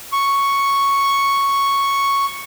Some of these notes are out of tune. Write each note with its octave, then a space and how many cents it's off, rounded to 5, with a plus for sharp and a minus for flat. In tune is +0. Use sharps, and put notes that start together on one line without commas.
C#6 +0